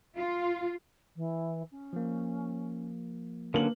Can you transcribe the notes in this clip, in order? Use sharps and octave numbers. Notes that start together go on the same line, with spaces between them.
F4
E3
C#4
F3 A#3
D3 F#3 A#3 C#4 B4 F#7